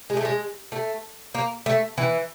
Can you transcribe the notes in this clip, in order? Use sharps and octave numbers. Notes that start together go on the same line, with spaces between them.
G#3
A3
G#3
A3
A#3
A3
E3